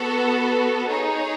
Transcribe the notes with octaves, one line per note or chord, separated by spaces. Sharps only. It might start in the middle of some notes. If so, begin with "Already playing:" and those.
Already playing: B3 F#4 A4
D#4 G#4 C#5